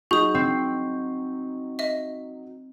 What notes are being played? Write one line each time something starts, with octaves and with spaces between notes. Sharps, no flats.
F#3 D#4 G#4 C#6 D#6 G6
C4
D#5 E5